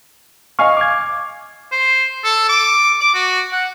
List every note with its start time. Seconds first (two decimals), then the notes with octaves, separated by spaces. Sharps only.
0.59 D#5 F5 G#5 C#6 F6
0.77 D6 G#6
1.72 C5
2.24 A4
2.49 D6
3.00 D6
3.14 F#4
3.52 F#5